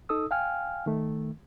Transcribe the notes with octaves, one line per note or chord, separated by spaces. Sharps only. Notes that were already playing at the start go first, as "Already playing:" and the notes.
D#4 A4 D#6 E6
F5 G5 G#5 F6
D#3 A3